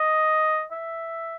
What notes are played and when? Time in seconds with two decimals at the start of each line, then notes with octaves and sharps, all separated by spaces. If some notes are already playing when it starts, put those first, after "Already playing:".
Already playing: D#5
0.72 E5